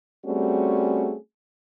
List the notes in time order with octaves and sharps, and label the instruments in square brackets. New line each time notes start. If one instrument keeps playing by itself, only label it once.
[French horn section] G3 A3 C4 C#4 F#4 G#4